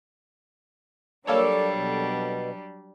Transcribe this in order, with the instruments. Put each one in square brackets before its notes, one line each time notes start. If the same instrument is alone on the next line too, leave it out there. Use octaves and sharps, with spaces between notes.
[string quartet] F#3 G3 D4 [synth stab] A#3 A4 C#5 [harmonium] D5
[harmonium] B2